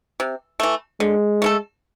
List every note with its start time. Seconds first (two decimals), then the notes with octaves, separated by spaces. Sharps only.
0.20 C3
0.60 E3 A3
1.00 D3 G#3
1.42 A3 E4 A4